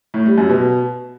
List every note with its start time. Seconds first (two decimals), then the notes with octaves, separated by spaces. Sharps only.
0.14 A2
0.26 G3
0.38 F#2
0.50 B2